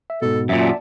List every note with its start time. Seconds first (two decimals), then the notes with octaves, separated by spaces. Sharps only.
0.10 E5
0.22 G#2 B2 A4
0.49 F#2 A#2 E5
0.61 D5 A5